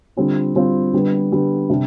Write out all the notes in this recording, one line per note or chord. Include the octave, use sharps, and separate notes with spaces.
D3 G3 C4 F4
D3 G3 C4 F4
D3 G3 B3
D3 G3 B3
C3 G3 D4